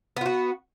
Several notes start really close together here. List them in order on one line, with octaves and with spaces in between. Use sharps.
B3 F4 F#4